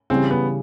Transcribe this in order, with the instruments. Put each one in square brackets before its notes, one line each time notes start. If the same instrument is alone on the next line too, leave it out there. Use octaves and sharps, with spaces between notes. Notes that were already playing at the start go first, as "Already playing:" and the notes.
[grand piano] C#3 E3 G3 [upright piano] C4
[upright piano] B3